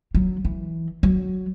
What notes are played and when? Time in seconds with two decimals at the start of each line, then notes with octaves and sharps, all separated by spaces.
0.15 F#3
0.45 E3
1.03 F#3